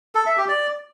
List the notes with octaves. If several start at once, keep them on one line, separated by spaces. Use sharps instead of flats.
A4
E5
G4
D5